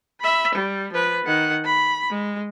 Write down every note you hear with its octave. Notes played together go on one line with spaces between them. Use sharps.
E5 B5
G3
F3 B4
D#3 F#5
B5
G#3